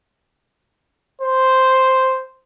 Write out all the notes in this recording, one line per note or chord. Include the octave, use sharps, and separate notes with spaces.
C5